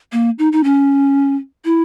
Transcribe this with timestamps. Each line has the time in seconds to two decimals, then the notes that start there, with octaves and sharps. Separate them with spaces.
0.12 A#3
0.39 D#4
0.53 D#4
0.64 C#4
1.65 E4